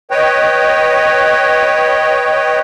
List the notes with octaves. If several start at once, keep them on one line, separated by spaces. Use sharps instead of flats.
B4 C#5 D#5 G5